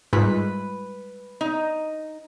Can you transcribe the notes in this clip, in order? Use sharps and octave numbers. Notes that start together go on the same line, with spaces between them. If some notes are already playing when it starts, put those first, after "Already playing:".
G#2 G3 G#3 F4 B4
D#4